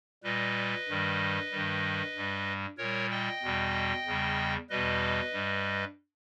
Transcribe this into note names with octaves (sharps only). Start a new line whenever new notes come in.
A#2 G3 B4 D#5
G2 D#3 G3
G2 D#3 G3
G2 G3
A#2 G3 A#4 C#5
D#5 G5
E2 B2 G3
E2 C#3 G3
E2 B2 G3 B4 D#5
G2 G3